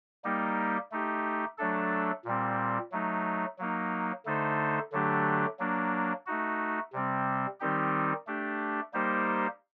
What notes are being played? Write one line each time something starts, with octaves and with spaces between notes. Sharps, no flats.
G3 A#3 D#4 G4
A3 D#4 G4
F#3 A3 D4 A4
A#2 G3 C4
F#3 A3 D#4
F#3 A#3 D#4
D3 A3 D#4 A4 C5
D3 F#3 A3 D4 G4
F#3 A#3 D4
A3 D#4 F#4
C3 G3 C4
D#3 G3 C4 D#4 G4
A3 D4 G4
G3 A#3 D#4 G4 C5